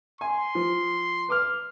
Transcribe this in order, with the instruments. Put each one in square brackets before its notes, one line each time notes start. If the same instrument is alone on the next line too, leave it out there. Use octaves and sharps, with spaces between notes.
[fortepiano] G#5 [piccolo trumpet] C6
[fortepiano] F3
B4 D6 F6